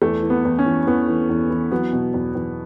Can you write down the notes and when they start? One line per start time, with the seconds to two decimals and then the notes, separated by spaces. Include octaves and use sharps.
0.02 E2 A3
0.23 E3
0.30 B3
0.45 E2
0.59 C#4
0.65 E3
0.87 E2 B3
1.08 E3
1.29 E2
1.50 E3
1.71 F#3 B3
1.93 B2
2.14 E2
2.35 E2